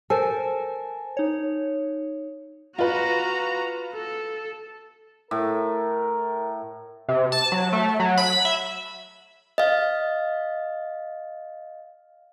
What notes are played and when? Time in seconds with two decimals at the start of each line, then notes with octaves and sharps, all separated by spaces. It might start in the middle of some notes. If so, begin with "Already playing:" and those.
0.10 A4 A#4 C5 G#5
1.17 D#4 C#5
2.79 F4 F#4 B4 A#5
3.95 A4
5.31 A2 A#4
7.09 C3
7.32 A5
7.52 F#3
7.73 A3
8.00 F#3
8.17 B5
8.45 E5
9.58 D#5 F5